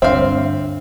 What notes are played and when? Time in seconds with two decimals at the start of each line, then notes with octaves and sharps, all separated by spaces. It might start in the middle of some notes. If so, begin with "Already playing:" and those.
0.02 D2 G2 D3 C4 E5 F5